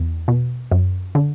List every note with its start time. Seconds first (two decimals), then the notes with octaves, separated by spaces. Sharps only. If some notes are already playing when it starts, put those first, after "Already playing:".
Already playing: E2
0.28 B2
0.72 F#2
1.15 D3